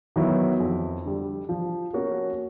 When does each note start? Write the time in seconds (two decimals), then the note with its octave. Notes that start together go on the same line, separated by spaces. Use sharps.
0.16 D#3 F#3 B3 E4
0.60 F2
1.05 D3 G3
1.49 F3
1.93 A#3 C#4 F#4 A#4